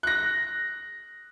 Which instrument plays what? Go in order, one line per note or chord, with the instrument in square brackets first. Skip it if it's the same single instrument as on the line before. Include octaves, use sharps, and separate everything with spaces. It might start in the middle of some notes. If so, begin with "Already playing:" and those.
[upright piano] F#6 A#6